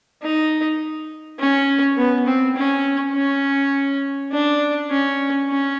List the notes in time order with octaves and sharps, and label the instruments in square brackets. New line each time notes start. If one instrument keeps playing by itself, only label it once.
[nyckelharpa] D#4
C#4
B3
C4
C#4
C#4
D4
C#4
C#4